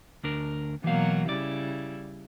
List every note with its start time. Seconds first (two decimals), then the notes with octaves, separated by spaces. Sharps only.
0.24 D2 D4 A#4
0.84 B2 E3 F#3 A#3 F5
1.29 C#3 G3 E4 D5